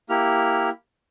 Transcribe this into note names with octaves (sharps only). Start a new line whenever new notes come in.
A#3 E4 G4 F6